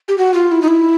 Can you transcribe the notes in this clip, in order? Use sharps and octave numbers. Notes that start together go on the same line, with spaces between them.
G4
F#4
F4
E4
D#4
E4